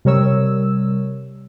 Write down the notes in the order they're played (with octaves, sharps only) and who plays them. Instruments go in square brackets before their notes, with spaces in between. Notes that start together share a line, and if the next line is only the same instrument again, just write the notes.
[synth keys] C3 G3 A#4 C#5 E6